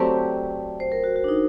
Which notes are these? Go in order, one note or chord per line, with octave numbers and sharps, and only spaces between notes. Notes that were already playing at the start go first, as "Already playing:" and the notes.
Already playing: F#3 A3 C4 G4 D5
C5
A#4
F#4
F#4
D4
D#4